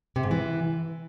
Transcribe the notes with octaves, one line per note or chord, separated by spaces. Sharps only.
C3
G#2
E3